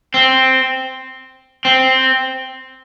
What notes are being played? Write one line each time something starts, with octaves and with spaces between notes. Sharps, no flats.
C4
C4